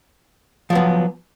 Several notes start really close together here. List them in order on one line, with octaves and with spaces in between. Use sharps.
F3 F#3 B3